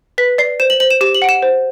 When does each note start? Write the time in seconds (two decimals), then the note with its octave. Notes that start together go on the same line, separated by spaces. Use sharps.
0.18 B4 B6
0.38 D5 C7
0.60 C5 E7
0.70 F#7
0.80 C5 F#7
0.91 E7
1.01 G4 E7
1.15 F#7
1.22 F#5 D7
1.29 E7
1.42 C5